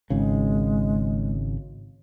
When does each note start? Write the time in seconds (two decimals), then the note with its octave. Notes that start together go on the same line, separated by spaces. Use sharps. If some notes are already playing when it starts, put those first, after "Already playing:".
0.10 G#1 C#3 G#3